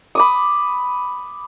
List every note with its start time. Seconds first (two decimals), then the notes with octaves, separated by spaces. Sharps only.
0.15 B5 D6 D#6